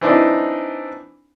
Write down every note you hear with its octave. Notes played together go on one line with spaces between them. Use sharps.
E3 C4 D4 D#4